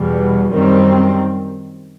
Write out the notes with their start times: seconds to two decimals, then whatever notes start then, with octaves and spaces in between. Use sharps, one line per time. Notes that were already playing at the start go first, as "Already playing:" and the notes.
Already playing: E2 B2 G3
0.51 F#2 D#3 G3 C4